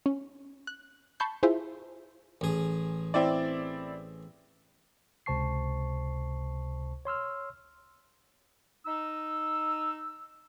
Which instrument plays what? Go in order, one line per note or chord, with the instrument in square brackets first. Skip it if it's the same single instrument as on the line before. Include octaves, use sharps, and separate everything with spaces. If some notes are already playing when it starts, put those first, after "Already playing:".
[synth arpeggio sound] C#4
F#6
A5 B5 C#6 G6 C7
E4 F4 G#4 C5 E5
[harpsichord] A1 G#4
[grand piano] C4 E4 D5
[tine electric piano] C#2 C3 C5 A5 C#6 C7
C#5 C6 E6 F6
[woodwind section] D#4 E6